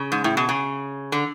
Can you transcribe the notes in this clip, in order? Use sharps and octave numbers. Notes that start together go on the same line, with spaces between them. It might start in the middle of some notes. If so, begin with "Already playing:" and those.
Already playing: C#3
G#2
A2
B2
C#3
D3